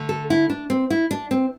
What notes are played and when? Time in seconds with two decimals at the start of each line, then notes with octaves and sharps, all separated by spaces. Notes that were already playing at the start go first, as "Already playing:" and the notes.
Already playing: D3 A3
0.09 A4
0.30 E4
0.50 D4
0.70 C4
0.90 E4
1.11 D4
1.31 C4